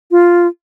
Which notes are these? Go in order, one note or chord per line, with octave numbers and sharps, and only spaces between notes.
F4